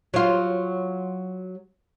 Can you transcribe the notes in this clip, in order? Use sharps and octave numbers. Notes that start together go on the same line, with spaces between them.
F#3 F4